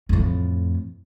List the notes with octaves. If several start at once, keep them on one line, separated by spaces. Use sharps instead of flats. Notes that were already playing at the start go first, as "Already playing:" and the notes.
F2 A2